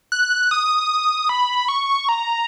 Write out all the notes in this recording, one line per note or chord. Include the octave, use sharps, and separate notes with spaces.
F#6
D#6
B5
C#6
A#5